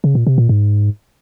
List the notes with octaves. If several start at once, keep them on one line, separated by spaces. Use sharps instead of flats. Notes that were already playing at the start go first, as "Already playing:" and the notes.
C#3
A#2
C3
A#2
G#2